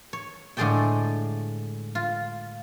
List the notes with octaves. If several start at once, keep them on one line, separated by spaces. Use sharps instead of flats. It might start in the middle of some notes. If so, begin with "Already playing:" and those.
C#5
A2 D3 G#3 G#4 D5 G5
F4